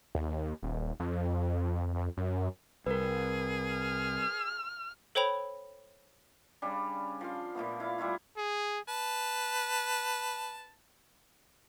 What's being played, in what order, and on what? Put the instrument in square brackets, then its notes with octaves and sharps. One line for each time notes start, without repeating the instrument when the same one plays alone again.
[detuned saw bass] D#2
D#1
F2
F#2
[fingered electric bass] C2 [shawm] G#4 [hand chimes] A#4 B4
[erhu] F6
[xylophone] A4 C5 C#5 G5 B5 F7
[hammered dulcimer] C#3 G3 C#4 D4
F3 F5 C6
A#2 F3 A3 B3
E4 F5
G3 A3 E4 F4
[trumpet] G#4
[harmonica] B4 A5